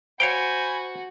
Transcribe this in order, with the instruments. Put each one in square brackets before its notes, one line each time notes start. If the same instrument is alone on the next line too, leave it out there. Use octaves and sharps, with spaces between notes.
[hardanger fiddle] F#4 [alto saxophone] C5 [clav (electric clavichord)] C#5 F5 G5 [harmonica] G#5 B5